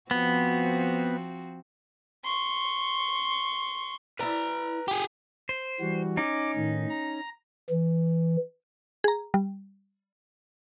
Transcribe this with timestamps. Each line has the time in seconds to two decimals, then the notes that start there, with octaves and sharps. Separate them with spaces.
0.11 F3 B3 C4 F#4
2.24 C6 C#6
4.19 E4 B4 D5 A#5
4.88 G4 G#4
5.49 C5
5.80 E3 G3 F#4
6.17 C#4 D#4 D6
6.56 A2 D#3
6.89 A#5
7.70 E3
9.04 G#4 A#5
9.34 G3